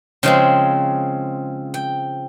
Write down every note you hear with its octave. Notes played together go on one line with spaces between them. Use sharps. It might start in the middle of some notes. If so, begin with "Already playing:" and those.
C#3 F3 G#3 C4 G5
G5